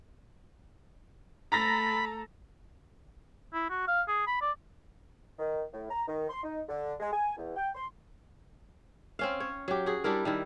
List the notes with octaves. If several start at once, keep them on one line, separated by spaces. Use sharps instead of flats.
A3 A4 A#5 B5 A6 A#6
E4
F#4
F5
G#4
B5
D5
D#3
A2
A#5
D#3
C6
D#4
D3
G#3
G#5
E2
G5
C6
C4 C#4 F5
C#5
F#3 G4
F#4 G#4
G3 D4 E4 A#4
D#3 G3 E4